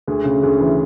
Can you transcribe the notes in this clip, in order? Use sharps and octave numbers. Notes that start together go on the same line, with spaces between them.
D2 G#4
C#3
D2 G#4
E3